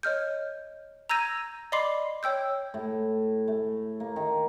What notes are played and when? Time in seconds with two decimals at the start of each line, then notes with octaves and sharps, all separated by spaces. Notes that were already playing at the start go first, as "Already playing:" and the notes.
0.03 C#5 D#5 F6 G6
1.09 A#5 E6 G6 G#6 A#6 D#7
1.72 D5 D#5 B5 C6 D6 C7
2.23 C#5 G5 E6 G6
2.74 A2
3.48 A3
4.00 A#3
4.16 D#3